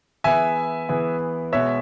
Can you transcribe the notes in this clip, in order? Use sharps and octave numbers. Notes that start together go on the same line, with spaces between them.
E3 B3 E4 G#4 B4 E5 G#5
E3 B3 E4 G#4 B4
B2 G#3 B3 F#4 C#5 E5